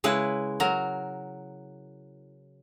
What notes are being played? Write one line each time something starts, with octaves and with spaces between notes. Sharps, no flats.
C#3 G#3 E4 B4
F#3 A#4